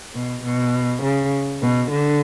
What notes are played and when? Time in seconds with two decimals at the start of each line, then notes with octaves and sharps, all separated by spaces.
0.15 B2
0.44 B2
1.03 C#3
1.62 B2
1.91 D3